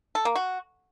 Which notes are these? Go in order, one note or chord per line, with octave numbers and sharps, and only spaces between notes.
A4
A#3
F#4